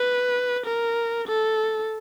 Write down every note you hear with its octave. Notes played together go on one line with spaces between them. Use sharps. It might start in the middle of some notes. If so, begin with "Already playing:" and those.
Already playing: B4
A#4
A4